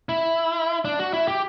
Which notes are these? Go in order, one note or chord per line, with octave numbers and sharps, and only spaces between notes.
E4
D4
F#4
E4
G4